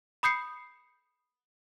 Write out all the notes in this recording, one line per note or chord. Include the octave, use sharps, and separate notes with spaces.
B5 D#6 G6 C7 C#7